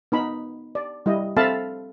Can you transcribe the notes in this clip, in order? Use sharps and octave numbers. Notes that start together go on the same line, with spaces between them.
B3 D#4 B5
D5
G3 E4 D#5
C4 A4 E5 F5 A5 B5